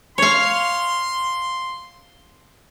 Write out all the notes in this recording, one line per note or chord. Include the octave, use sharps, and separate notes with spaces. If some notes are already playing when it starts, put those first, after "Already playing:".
C#5 F5 C6